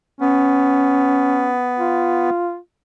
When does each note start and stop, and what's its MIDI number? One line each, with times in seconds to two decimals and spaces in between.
0.21 2.30 59
0.21 1.54 61
1.79 2.58 65